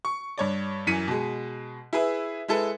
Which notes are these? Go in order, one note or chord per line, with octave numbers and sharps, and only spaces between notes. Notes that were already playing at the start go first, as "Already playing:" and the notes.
C#6
G2 C#5 D5
F#2 E3 B6 C#7 D#7
B2 G#3
E4 G#4 B4 E5
G#3 E4 A4 B4